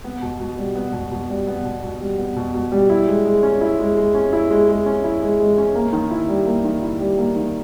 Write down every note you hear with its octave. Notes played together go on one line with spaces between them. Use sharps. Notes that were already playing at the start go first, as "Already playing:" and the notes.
B3
B2
B2
G3
B3
B2
B2
G3
B3
B2
B2
G3
B3
B2
B2
G3
E4
G#3
G#3
C#4
E4
G#3
G#3
C#4
E4
G#3
G#3
C#4
E4
G#3
G#3
C#4
A#3
D#3
E4
G3
A#3
D#3
E4
G3
A#3
D#3